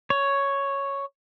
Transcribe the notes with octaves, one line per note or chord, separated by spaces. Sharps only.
C#5